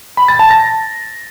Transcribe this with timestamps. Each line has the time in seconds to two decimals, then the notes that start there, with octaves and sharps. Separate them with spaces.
0.17 B5
0.28 A6
0.39 A5
0.50 A#6